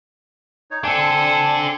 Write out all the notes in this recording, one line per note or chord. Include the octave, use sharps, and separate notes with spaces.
D#4 C#5
C4 D4 A4 G#5 C6